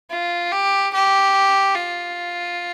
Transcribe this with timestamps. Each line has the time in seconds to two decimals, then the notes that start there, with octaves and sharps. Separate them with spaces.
0.11 F4
0.52 G4
0.93 G4
1.76 F4